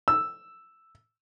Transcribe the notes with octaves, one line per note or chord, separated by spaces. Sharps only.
E6